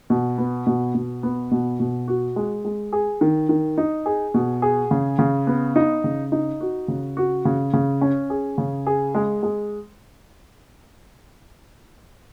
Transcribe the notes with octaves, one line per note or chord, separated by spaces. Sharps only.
B2
B3
B2
B2
B3
B2
B2
F#4
G#3
G#3
G#4
D#3
D#3
D#4
G#4
B2
G#4
C#3
C#3
B3
D#4
C#3
D#4
F#4
C#3
F#4
C#3
C#3
C#4
G#4
C#3
G#4
G#3
G#3